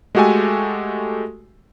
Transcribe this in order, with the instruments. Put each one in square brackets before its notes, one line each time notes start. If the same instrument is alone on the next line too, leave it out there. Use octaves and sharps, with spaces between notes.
[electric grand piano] G#3 A3 F#4 G4 A4 G#5